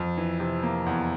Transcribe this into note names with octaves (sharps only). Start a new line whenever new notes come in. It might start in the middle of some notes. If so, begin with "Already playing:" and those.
Already playing: F2
E3
C3
A#3
E2